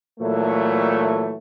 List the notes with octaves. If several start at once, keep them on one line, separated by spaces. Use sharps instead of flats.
A#2 E3 F#3 A3